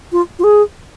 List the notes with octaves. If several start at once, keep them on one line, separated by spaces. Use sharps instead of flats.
F4
F4
G#4